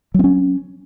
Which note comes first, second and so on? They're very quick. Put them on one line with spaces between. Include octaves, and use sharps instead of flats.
F#3 C4 C#4